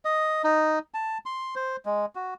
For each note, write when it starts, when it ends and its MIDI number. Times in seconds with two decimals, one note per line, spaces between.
0.05 0.42 75
0.44 0.79 63
0.94 1.18 81
1.26 1.55 84
1.56 1.76 72
1.86 2.06 56
2.15 2.34 66